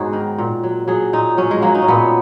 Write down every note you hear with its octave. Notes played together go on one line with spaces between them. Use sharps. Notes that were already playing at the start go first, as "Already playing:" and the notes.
Already playing: G#2 F#3 B3 D#4 F#4 G#4
D#3
A#2
F#3
F#3 G#4
A#2 D#4
F#3 C#4
G#3
F#3 A#3
D#4
C#4
A#2 B3